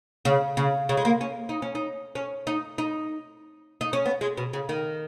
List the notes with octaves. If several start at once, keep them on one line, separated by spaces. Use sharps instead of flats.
C#3
C#3
C#3
G#3
A#3
C#4
D#4
C#4
D#4
C#4
D#4
D#4
D#4
C#4
B3
G#3
B2
C#3
D#3